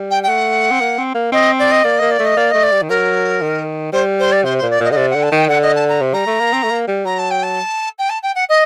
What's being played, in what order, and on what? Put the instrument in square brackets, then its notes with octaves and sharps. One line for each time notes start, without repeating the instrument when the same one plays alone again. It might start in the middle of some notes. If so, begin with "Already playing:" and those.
Already playing: [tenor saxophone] G3
[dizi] G5
G5
[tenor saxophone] A3 [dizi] F#5
[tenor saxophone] C4
A#3
C4
A#3
[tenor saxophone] C4 [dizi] D#5
[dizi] D5
D#5
[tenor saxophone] A#3 [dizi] D5
[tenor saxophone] A#3 [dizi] D#5
[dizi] D5
[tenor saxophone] A3
[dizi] D#5
[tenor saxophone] A#3 [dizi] D5
[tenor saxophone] A3 [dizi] D#5
[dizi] D5
[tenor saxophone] G3
D#3
[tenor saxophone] F#3 [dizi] A#4
[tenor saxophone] D#3
[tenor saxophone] G3 [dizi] C5
[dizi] C5
D5
[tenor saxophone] C3 [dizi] C5
[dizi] C5
[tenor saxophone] A#2
[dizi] D5
[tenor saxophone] A#2 [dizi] D#5
[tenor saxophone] D3 [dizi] D#5
[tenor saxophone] C3 [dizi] D5
[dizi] F#5
[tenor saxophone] D3
[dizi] A5
[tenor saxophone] D#3 [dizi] G5
[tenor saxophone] D3 [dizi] F#5
[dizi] D#5
A5
A#5
[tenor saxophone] C3
[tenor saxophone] G3 [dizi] A#5
[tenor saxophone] A3
A#3
C4
A3
A#3
G3
[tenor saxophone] F#3 [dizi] A#5
[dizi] A5
G5
A5
G5
A5
G5
F#5
D#5